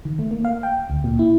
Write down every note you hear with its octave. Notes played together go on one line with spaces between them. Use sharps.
D#3
A3
A#3
F5
G5
D2
A#2
E4